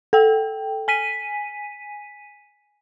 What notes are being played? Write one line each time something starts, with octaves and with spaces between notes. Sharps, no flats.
A4 G5
G#5 B6 D#7